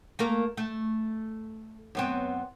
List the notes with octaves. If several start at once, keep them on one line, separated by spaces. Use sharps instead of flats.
A3 A#3 A#4
A3
F#2 B3 C4